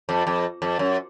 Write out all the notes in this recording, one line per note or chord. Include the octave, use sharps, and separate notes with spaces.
F2
F2
F2
F#2